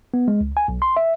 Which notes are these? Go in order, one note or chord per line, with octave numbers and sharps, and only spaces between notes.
B3
G#3
C#2
G#5
B1
C6
E5